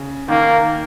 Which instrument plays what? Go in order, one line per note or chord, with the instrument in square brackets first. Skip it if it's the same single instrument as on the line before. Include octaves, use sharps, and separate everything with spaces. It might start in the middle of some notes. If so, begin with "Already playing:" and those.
Already playing: [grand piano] C#3
[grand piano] D#3 [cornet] A#3